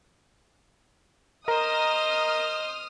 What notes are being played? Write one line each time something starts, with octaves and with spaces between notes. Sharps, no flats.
A#4 C5 D#5 A#5 D#6 F6